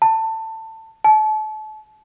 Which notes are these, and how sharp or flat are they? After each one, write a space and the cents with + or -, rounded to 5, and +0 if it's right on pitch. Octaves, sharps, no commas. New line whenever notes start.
A5 +20
A5 -35